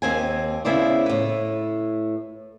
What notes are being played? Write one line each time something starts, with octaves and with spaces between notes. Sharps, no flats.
D#2 C4 G#5
C#3 B3 E4 C5 D5
A2 B4